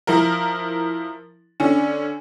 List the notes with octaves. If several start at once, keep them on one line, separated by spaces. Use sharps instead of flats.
F3 E4 A#4
D3 C#4